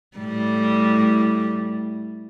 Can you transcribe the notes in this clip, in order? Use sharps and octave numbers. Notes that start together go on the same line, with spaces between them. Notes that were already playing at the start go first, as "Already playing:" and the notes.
A2 G3